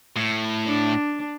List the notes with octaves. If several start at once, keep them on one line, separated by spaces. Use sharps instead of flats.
A2
D4